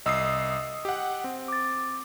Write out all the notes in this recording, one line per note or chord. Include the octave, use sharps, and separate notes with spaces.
C2 D#5 D#6 E6 C7
G4 F#5
C4
D6 A6